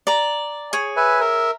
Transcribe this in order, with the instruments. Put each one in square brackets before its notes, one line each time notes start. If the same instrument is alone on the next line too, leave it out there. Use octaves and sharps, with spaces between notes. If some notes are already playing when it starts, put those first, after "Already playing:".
[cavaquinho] D5 A#5
G#4 C#5
[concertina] B4 E5 G#5
A#4 E5